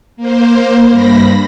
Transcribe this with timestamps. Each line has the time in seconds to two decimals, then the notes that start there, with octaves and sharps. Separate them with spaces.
0.17 A#3 C5
0.90 G2 B5 A#6